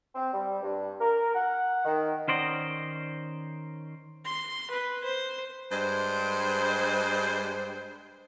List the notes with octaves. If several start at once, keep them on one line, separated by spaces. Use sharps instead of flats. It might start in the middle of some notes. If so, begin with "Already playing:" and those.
C4
G3
G2
A#4
F#5
D#3
D#3 C#4 C5 D5 D#5
C6
B4
C5
G2 G#3 C5